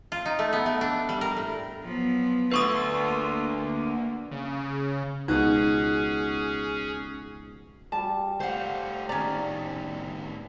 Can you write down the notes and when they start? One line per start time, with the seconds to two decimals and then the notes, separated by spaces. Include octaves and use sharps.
0.12 F4
0.25 D#4
0.39 A3
0.53 B3
0.66 A3
0.81 D4
1.09 G3
1.21 A#4
1.37 A2
1.82 F3 F#3 B3
2.52 D2 D3 F4 B4 C#6 D#6
3.02 A#3
4.31 C#3
5.28 C#2 B2 C#4 D#4 F#4 G#4
7.92 G3 A5
8.40 A3 F4 C5 F#5
9.09 A2 D#3 C#4 D5 A#5